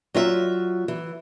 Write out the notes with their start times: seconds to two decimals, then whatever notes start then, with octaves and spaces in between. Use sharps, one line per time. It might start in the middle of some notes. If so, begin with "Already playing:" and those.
0.14 F#3 F4 E5
0.88 E3